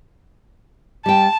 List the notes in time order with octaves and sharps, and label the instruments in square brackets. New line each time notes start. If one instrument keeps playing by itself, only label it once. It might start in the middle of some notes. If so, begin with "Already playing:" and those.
[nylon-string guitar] G3 G5 [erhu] A5